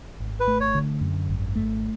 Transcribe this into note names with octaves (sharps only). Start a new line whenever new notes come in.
G#1
B4
A3
C#5
D3
F#2
G#1
A3